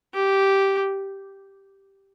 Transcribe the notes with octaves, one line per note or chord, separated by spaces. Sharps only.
G4